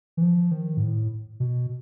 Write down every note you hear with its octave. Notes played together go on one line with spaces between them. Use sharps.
E3
F3
D#3
G#2
A2
B2